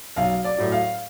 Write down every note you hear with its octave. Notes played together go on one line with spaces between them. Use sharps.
B1 F5
D5
A2 F#3
F5